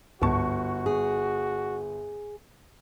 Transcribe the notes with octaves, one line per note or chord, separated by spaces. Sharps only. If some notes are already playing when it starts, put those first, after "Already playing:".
G1 C#2 G#2 F#4 A5 C#6
G#4